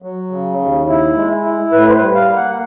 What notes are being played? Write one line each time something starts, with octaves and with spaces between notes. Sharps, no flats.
F#3
C#3
D#2
E4
G#3
E4
A2 B4
C5
B4
G3
F5
A#3
F#5